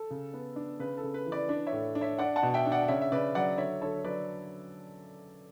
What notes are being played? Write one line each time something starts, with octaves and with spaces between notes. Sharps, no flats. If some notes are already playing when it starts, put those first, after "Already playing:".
Already playing: A4
C#3
B3
D4
C#3 B4
A4
C#3
B4
E3
B4 D5
D4 B4
C#5 E5
A2
D4
C#5 E5
D4 D5 F#5
F#5 A5
B2
E5 G5
D4
D5 F#5
C#3 C#5 E5
E5
C#3 B4 D5
F#3 D5 F#5
D3 C#5 E5
D3 A4 C#5
F#3 B4 D5